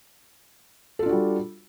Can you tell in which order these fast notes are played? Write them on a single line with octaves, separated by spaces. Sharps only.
A4 F4 D4 F#4 G3